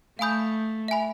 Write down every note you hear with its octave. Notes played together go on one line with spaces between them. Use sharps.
A3 F5 G#5 B5 D#6 G6
E5 G#5 B5